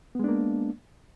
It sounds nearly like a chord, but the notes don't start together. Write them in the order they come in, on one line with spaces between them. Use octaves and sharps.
B3 G#3 D4 A#3